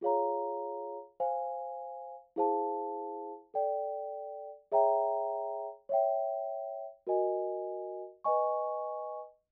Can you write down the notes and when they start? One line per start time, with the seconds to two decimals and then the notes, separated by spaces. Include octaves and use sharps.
0.01 F4 G#4 C#5 F5 A#5
1.20 C5 F5 G#5
2.36 E4 G#4 C5 F5 A5
3.54 A4 D5 G5
4.72 G#4 C#5 E5 G5 A#5
5.89 C#5 E5 G5
7.07 F#4 A#4 D#5 G#5
8.24 B4 D#5 G#5 C#6